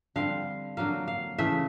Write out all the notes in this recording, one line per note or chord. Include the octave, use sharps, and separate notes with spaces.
D3 G3 C4 F5
D3 F#3 A#3 F5
F5
C#3 E3 A3 E5